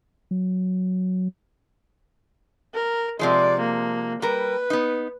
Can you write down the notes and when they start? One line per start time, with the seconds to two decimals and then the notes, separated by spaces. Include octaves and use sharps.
0.31 F#3
2.75 A#4
3.19 C3 F3 G#3 D5
3.60 A#3
4.22 G3 A#4 B4
4.70 B3 D#4